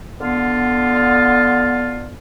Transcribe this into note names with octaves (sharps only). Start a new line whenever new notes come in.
D3 B3 F4